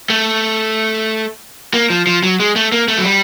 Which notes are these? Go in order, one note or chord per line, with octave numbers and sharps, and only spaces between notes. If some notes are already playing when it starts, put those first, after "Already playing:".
A3
A#3
F3
F3
F#3
G#3
A3
A#3
A3
F#3
G3